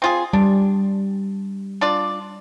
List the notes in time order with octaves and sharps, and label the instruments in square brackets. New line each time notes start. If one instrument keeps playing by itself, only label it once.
[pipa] C4 F4 G#4
[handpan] G3 [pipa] D4
[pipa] D4 F4 D5